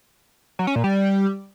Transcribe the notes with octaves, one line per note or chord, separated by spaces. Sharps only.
F#3
C#4
A#2
G3